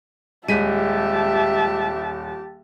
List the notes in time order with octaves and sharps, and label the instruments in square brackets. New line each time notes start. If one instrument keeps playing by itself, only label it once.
[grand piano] D#1 B6 D#7 [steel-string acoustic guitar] G#3 [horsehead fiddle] G4 A5 [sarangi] E5